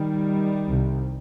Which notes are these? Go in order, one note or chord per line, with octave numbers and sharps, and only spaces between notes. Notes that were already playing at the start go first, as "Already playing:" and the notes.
Already playing: D#3 G3
C2 C3